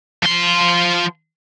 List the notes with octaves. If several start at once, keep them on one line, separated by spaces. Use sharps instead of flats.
F3 C6